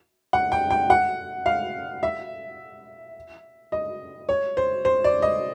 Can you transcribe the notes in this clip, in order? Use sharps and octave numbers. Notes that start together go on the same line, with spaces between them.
F#5
G5
G5
F#5
F5
E5
D#5
C#5
C5
C5
D5
D#5